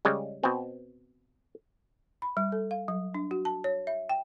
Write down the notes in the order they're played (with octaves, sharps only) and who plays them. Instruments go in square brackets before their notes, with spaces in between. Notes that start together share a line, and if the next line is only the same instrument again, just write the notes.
[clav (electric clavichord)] C#3 G3 G#3
B2 C4
[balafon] B5
G3
A4
F5
F#3
D4
F#4
A5
C#5
E5
G5